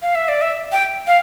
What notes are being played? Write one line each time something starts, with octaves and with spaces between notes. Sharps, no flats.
F5
E5
D5
E5
G5
F5